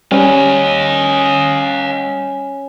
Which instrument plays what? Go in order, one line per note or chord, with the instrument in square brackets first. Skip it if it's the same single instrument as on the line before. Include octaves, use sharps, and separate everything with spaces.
[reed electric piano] G3 [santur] C#4 [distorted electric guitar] D#5 F5